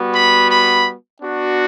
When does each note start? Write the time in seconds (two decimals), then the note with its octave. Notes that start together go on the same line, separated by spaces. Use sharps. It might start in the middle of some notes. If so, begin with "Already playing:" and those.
Already playing: G3 B3 F#4
0.13 B5
0.50 B5
1.22 B3 D4 F#4